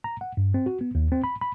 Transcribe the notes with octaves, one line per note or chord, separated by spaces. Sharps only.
A#5
F#5
G2
C4
F#4
B3
D#2
C4
B5
B5